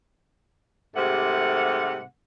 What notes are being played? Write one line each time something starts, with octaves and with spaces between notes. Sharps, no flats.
G#2 C3 G3 A3 F#5